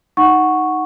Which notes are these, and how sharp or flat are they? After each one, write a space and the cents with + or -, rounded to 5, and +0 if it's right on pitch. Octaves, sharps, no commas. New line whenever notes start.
D#4 +0 F#5 +0 C#6 +0